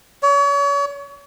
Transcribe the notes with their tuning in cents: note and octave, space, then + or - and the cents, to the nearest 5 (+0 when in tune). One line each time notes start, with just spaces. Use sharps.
C#5 +35